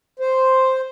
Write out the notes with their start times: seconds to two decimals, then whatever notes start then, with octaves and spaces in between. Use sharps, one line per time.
0.19 C5